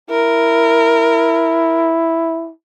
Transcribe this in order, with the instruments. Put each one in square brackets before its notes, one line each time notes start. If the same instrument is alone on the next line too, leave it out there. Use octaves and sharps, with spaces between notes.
[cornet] E4 [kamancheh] A#4